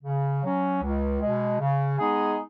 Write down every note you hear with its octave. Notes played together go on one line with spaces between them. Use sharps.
C#3
F#3 C#4
C#2
B2 G#3
C#3
G#3 B3 D#4 G#4